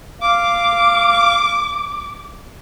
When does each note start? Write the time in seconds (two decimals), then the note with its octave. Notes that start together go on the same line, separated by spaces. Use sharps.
0.22 F5 D6